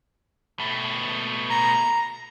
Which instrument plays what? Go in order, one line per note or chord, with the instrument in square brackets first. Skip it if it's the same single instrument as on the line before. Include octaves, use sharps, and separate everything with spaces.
[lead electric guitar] B2 A3
[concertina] A#5